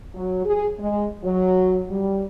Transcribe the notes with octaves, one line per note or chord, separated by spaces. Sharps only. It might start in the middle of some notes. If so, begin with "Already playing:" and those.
F#3
G#4
G#3
F#3
G3